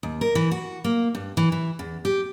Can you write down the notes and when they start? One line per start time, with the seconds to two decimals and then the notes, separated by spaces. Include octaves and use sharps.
0.03 D#2
0.21 A#4
0.35 E3
0.51 F#4
0.84 A#3
1.15 G2
1.37 E3
1.52 E3
1.79 E2
2.05 G4